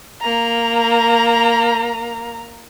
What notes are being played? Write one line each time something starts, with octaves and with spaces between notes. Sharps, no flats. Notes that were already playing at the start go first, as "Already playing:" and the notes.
A#3 A#5